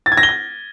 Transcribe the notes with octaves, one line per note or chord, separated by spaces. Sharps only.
A6
G#6
A#6
G7
A#6